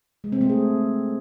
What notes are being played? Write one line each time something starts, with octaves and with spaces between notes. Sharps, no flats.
G#3
C4
A3
G#4